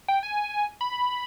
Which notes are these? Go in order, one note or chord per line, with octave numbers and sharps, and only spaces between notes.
G5
G#5
B5